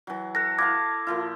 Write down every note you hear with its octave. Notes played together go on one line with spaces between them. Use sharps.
E3 F#3
A4 F#6 A#6
E4 F5 A5 D6 G#6 A#6
A#2 F3 E4